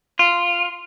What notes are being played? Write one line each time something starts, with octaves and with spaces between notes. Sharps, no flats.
F4